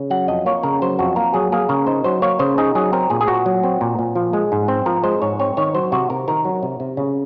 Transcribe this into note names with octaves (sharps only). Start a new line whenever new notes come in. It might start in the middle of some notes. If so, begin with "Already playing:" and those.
Already playing: C#3
F#3 F#5
F2 D#5
A#3 C#5
C#3 A#4
F#3 C5
F2 F#4
A#3 A#4
F#3 G#4
A#3 G#4
C#3 A#4
D#4 C5
F#3 C5
A#3 C#5
C#3 C5
D#4 G#4
F#3 G#4
C4 A#4
A#2 G#4
G#4
A#2 F#4
F#3
C4
A#2
A#2
F3
G#3
G#2
C4
F3 A#4
G#3 C5
G#2 C#5
C4 C#5
D#3 C#5
F#3 C5
C3 F#4
C3 A#4
D#3 A#4
F#3
C3
C3
C#3